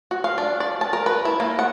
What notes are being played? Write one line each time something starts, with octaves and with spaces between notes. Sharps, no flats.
F#4
F5
D4
D5
A5
A#4
B4
E4
A#3
F#5